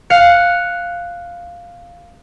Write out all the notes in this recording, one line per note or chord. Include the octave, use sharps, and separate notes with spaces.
F5 F#6 C#7